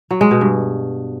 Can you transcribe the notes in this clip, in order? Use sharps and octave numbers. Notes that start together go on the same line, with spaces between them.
F#3
G#3
B2
G2